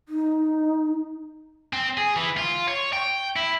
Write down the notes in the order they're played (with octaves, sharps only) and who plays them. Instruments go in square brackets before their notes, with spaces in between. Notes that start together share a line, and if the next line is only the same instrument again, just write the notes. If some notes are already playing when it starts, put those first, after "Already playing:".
[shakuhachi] D#4
[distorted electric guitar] C4
G#4
E3
F4
C#5
G5
E4